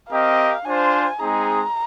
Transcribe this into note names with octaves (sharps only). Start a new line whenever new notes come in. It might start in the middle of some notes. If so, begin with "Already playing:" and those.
C4 G4 A#4 D#5 F5
D4 F4 C5 G#5
G#3 C4 D#4 G#4 A#5